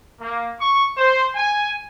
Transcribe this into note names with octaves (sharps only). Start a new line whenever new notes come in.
A#3
C#6
C5
G#5